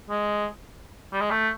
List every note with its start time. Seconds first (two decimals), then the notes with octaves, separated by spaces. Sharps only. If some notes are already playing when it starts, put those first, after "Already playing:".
0.10 G#3
1.13 G3
1.21 G#3
1.31 A3